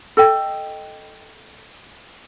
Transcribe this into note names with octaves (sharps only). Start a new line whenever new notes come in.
A4 D#5 G5